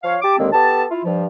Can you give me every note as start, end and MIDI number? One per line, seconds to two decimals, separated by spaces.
0.04 0.16 53
0.04 0.16 73
0.04 0.16 77
0.22 0.36 67
0.22 0.36 81
0.22 0.36 86
0.37 0.48 39
0.37 0.48 50
0.37 0.48 51
0.37 0.48 56
0.37 0.48 58
0.37 0.48 60
0.52 0.83 59
0.52 0.83 67
0.52 0.83 69
0.52 0.83 81
0.90 1.03 64
0.90 1.03 65
1.04 1.26 43
1.04 1.26 53